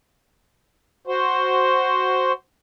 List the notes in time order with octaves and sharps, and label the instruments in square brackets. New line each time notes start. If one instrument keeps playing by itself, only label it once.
[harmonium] F#4 C5